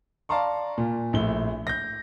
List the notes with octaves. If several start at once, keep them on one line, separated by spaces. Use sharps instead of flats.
D5 F5 A5 A#5 C6 C#6
A#2
A#1 A2 G7
G6 A#6